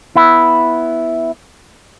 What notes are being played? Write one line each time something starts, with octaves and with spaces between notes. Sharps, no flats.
B3 E4